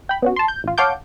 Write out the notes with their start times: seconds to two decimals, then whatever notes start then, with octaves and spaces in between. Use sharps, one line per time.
0.09 G5 B5
0.22 B3 C#4 F#4
0.36 A5 C6
0.48 G6
0.64 A1 F4
0.78 C#5 F5 F#5 A5 D6 G6